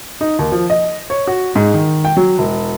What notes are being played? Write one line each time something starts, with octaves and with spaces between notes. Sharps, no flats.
D#4
D#2
F3
D#5
C#5
F#4
G#2
D#3
G5
F#3
E1